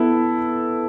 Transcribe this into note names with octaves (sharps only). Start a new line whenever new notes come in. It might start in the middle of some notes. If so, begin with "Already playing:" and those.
Already playing: B3 E4 A4